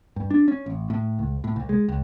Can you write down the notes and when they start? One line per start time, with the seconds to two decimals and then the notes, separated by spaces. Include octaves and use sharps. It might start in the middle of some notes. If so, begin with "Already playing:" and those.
0.16 G2
0.31 D4
0.48 C#4
0.66 A1
0.90 A2
1.19 C#2
1.44 A2
1.56 C2
1.69 G#3
1.89 C#2